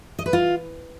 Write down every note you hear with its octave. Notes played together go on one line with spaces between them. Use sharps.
D#5
B4
F4